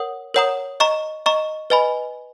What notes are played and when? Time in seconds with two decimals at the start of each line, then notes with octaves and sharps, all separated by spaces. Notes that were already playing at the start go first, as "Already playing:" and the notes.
Already playing: A#4 C#5 F#5 D#6
0.34 A#4 C#5 F#5 A#5 D#6
0.80 D#5 A#5 C#6
1.26 D#5 A#5 C#6
1.70 B4 D#5 G#5 B5